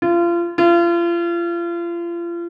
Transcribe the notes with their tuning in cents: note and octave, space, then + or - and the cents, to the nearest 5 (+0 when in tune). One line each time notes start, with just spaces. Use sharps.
F4 -30
F4 -35